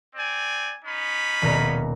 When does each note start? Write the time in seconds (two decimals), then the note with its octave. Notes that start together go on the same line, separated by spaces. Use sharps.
0.16 C4 D5 G#5
0.85 C#4 D#4 B5
1.42 D#1 B2 A#5